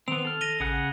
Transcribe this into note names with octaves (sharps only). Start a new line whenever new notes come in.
D#3 B3 C4 F7
A4 F6
A#6 D#7 G7
A1 C#3 G#4 F#5